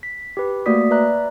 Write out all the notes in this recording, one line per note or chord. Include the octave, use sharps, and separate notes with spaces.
B6
G4 B4
A3 A#3 F#4 D5 D#6 B6
B4 D5 E5 A#5 F#6